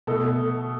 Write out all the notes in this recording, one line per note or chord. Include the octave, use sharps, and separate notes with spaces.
B2 A3 A4